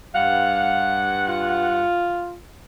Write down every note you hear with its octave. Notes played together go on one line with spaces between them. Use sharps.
G2 F5 F#5
F4